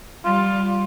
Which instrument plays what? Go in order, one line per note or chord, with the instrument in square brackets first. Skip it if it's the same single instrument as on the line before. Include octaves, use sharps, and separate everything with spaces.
[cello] G3 [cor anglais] F4